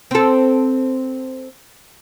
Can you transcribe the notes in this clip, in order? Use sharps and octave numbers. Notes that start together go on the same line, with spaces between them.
C4 A4